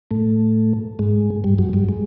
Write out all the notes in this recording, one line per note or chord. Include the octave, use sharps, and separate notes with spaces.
A2 A3
G#2 G#3
G2 G3
F#2 F#3
G2 G3
G#3